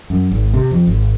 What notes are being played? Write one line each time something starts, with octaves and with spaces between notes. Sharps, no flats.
F#2
G#1
C3
F2
G#1